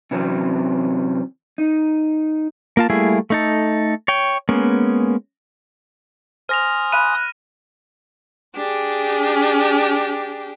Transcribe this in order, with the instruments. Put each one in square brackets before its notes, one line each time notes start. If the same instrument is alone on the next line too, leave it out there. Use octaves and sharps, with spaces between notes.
[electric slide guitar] C3 E3 F#3 C4 C#4
D#4
[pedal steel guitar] A#3 F4 A5
G3 A3 A#3 E4 G#4
A3 D#4 A4
C#5 G5
G#3 A#3 B3 C#4
[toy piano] C5 [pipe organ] G#5 C6 D#6 [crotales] F6 A#6 F7
[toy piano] F5 B5 [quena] F#6 [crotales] D#7
[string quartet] D4 G4 G#4